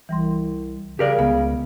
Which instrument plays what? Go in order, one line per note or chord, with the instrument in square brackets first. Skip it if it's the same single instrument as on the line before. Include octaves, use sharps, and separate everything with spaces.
[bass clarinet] C2 [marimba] E3 G3 C6
[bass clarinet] C#3 [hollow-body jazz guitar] G4 A#4 D5
[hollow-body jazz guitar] C#2 [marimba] B3